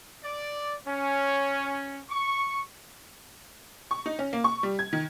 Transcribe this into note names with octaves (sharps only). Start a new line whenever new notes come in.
D5
C#4
C#6
C#6
D#4
C#4
A#3
C#6
G3
G#6
D#3